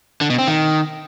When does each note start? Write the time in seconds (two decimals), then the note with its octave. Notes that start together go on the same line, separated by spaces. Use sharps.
0.21 D3
0.30 B2
0.39 C4
0.47 D#3